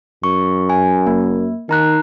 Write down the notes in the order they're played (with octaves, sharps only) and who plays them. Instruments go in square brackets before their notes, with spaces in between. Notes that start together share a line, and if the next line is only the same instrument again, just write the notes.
[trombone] F#2 [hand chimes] C#6
[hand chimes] G#5
A#3
[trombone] D#3 [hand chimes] D#4 A#5 F#6